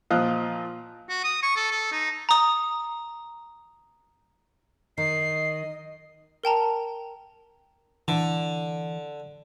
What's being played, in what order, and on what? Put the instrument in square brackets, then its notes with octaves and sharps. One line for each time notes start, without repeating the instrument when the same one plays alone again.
[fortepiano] A#2 F3 D#5 F5 F#6
[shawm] F#4
D#6
C#6
A4
A4
D#4
[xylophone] A#5 D#6
[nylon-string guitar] D#3 [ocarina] D#5 [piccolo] C7
[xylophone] A#4 G5 A5 A#5
[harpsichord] D3 [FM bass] E3